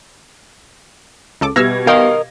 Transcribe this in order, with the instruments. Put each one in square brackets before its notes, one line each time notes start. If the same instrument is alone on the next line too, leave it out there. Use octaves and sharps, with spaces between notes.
[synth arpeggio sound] C#2 A4 D6
[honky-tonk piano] B2 G3 G#6 [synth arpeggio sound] E5 E6 F6 [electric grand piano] A#6
[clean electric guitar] A#4 D#5 [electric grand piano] F5 [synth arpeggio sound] G5 C6